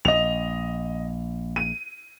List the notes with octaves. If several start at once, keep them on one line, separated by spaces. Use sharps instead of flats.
A#1 D#5 F7
D#7